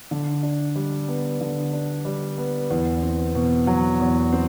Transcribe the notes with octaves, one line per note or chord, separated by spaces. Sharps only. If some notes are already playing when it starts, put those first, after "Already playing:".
D3
D4
G3
B3
D3
D4
G3
B3
E2
C4
B2
F#3
E2
C4